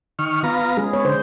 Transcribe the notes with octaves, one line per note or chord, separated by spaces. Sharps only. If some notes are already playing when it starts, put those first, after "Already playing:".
D#3 C#6 F6
B3 F4 A#5
G#3 C#4 G#4
B3 C#5
D3 C5